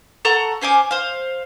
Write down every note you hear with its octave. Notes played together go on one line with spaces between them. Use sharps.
A4 F#5 A#5 C#6
C#4 C5 G#5 D6
C5 F5